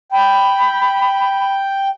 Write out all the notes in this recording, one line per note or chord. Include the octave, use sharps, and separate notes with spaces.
G5 B5